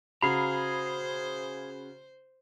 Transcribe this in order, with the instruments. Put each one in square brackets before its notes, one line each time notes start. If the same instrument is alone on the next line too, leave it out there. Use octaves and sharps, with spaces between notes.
[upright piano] C#3 F#4 [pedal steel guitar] G#4 F5 A#5 [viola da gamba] C5 [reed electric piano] B5